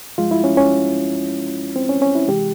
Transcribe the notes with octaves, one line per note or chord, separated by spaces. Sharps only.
G2 F3 G#3 F4
E4
C#4
C#4
C4
C#4
C#4
E4
C#2 C3 E3 G#3 G4